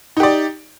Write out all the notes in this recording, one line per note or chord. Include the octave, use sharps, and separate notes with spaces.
D#4 G4 D5